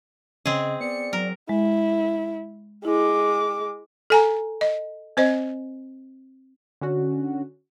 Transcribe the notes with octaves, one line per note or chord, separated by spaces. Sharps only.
C#3 C4 G#4 D#5
B3 D5 C#7
F#3 A#4
G#3 E4
G#3 E4 D6
A4 G#5 A#5
D#5
C4 C5 D#5
D3 C#4 F#4